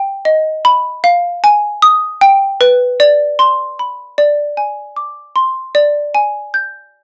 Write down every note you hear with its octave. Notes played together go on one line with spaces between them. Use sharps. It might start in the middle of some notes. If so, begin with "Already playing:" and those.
Already playing: G5
D#5
B5
F5
G#5
D#6
G5
B4
D5
C6
B5
D5
G#5
D6
C6
D5
G#5
G6